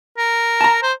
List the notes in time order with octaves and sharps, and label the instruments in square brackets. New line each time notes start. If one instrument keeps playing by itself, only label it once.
[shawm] A#4
[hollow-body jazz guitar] A5 A#5
[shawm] C5